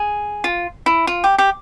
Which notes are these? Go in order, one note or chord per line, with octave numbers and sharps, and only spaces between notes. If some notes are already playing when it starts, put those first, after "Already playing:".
Already playing: G#4
F4
E4
F4
G4
G4